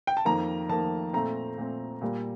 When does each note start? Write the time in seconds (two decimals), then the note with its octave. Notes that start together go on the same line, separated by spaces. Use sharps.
0.07 G5
0.17 A5
0.25 F2 D#3 A#3 A#5
0.69 F2 D#3 A#3 A5
1.13 A#2 A3 C4 A#5
1.58 A#2 A3 C4
2.01 A#2 G3 A#3